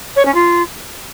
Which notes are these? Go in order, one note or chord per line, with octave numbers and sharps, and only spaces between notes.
C#5
C#4
F4